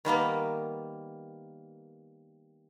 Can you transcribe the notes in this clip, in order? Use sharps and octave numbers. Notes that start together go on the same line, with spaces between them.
D#3 G3 A#3 B3